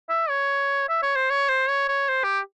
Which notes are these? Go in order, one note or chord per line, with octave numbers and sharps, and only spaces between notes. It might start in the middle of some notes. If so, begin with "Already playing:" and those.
E5
C#5
E5
C#5
C5
C#5
C5
C#5
C#5
C5
G4